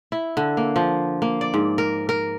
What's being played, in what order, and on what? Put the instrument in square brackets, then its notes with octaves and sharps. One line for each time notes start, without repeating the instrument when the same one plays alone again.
[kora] E4
D3
A#3
F3
A#3
D5
G#2
A#4
A#4